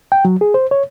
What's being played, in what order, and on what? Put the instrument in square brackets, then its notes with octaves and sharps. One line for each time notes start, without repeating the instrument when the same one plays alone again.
[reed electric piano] G5
F#3
G#4
C5
C#5